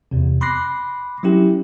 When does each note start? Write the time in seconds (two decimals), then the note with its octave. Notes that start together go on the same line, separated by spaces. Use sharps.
0.11 E2 C3
0.41 B5 C6 D6 F#6 A#6 C7
1.23 F#3 C#4 E4 G4